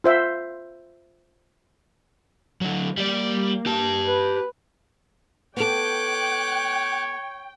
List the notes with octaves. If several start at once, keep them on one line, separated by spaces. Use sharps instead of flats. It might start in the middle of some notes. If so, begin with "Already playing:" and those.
F4 C5 E5
D3 F#3
G3 A#3 D5
G4 A5
B4
B3 A4 C#5 G5 D6 F#6